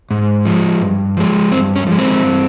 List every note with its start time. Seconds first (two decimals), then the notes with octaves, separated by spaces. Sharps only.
0.11 G#2
0.46 F3 G#3
0.81 G2
1.17 F3 G#3
1.51 G2 C4
1.76 C#4
1.87 F3 G#3
1.99 C4
2.22 G2